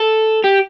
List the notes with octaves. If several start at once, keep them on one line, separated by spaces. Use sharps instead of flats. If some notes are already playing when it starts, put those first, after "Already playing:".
Already playing: A4
G4